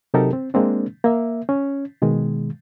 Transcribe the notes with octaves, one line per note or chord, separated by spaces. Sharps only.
C3 F#3 D#4 G4 A4 A#4
C4
G#3 A#3 C4 D4
A#3 E5
C#4
B2 D#3 G#3